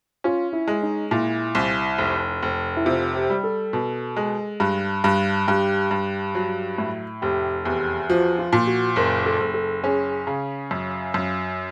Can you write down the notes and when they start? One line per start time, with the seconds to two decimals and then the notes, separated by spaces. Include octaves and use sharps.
0.24 C#4 F4
0.53 E4
0.68 G#3
0.83 D#4
1.11 A#2 E4
1.55 C2
1.98 F1
2.43 F1
2.77 E4
2.86 C3 F4
3.15 G4
3.30 G3
3.43 A4
3.73 B2
4.17 G#3
4.60 G2
5.04 G2
5.47 G2 G4
5.91 G2
6.35 F#3
6.78 A2
7.22 F1 G4
7.65 E2 G4
8.09 F3 F#4
8.39 F4
8.53 A#2
8.67 F#4
8.96 F#1 A#4
9.26 A4
9.40 F#1
9.54 A4
9.83 C#4 G#4
10.27 C#3
10.71 F#2
11.14 F#2